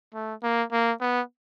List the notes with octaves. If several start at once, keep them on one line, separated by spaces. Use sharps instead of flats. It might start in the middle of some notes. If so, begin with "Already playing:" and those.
A3
A#3
A#3
B3